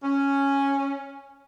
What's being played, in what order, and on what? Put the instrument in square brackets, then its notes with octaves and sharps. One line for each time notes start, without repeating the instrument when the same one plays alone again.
[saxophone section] C#4